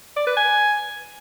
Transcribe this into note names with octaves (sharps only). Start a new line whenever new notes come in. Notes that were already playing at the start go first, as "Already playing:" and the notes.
D5
B4
G#5